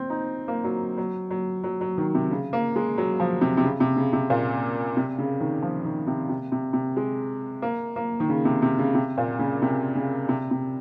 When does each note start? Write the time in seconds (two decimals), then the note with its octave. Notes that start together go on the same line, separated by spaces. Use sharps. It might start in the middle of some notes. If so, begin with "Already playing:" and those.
Already playing: C4
0.10 D#4
0.48 A#3
0.64 F#3
0.98 F#3
1.31 F#3
1.64 F#3
1.81 F#3
1.98 D#3
2.15 C3
2.31 C#3
2.53 A#3
2.76 G#3
2.98 F#3
3.20 F3
3.41 C3
3.57 C3
3.64 C#3
3.80 C3
3.96 C#3
4.13 C3
4.30 A#2
4.97 C3
5.18 C#3
5.40 D#3
5.62 F3
5.85 D#3
6.07 C3
6.29 C3
6.52 C3
6.73 C3
6.97 G#3
7.62 A#3
7.96 A#3
8.20 D#3
8.29 C#3
8.45 C3
8.62 C3
8.79 C#3
8.95 C3
9.17 A#2
9.39 C#3
9.62 C3
9.95 C#3
10.29 C3
10.51 C3